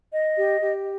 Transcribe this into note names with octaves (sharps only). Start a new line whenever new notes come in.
D#5
G4
G4